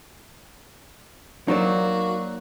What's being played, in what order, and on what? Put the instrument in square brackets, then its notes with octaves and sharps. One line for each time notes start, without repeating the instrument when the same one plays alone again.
[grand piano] F#3 [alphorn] A#3 [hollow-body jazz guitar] D#4 C5 D5 [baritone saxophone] F#4